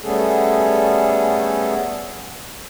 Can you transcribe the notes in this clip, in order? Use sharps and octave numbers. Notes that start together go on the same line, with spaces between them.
G3 A3 B3 C#4 G#4 A4